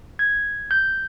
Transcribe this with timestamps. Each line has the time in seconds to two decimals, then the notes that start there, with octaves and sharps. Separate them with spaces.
0.19 G#6
0.71 G6